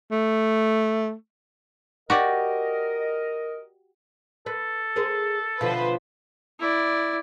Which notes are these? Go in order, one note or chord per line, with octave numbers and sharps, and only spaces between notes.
A3
F#4 G4 A#4 D5 D#5
A4 B4
G#4 A#4 C5
B2 D3 F3 B4 C5
E4 D5